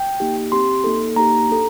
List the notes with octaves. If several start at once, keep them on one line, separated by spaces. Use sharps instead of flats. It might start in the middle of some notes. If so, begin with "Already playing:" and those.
Already playing: G5
A#3 D#4 G4
C4 G4 C6
A#3 D#4 A4
A#3 D#4 G4 A#5
D4 A4